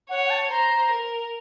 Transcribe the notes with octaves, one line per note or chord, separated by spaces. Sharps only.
C#5 F#5
F#5
A5
C5 A#5
A#4